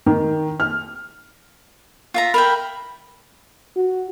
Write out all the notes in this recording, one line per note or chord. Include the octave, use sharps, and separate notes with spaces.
D#3
F6
F4 E5 A#5
A#4 E5 G5 B5
F#4